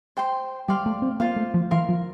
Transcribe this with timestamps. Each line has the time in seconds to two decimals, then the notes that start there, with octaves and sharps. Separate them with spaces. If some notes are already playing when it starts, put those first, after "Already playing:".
0.17 C5 G5 C6
0.68 G3 G4 D5 F5 C6
0.86 A3
1.02 C4
1.20 A#3 F4 C5 F5
1.36 A3
1.54 F3
1.71 E3 A#4 F5 C6
1.89 F3